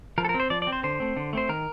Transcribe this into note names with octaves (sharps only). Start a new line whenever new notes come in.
F3 A#4
A4
A#4
C4
C5
F3 D5
D5
C4
C5
D3 C5
A3 C4
D3
A3 C4 C5
D#3 A#4